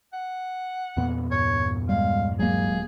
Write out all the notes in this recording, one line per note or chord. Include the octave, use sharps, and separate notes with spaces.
F#5
E2 A#2 B3
G2 C#5
G3 G#3 F5
D#1 F#3 G#3 A#3 G#4